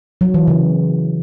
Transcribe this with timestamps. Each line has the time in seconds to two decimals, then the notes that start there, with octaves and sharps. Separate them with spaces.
0.21 F#3
0.34 E3
0.48 C#3